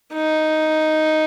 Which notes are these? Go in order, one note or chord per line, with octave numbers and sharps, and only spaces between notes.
D#4